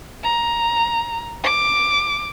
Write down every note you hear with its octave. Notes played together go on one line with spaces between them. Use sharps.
A#5
D6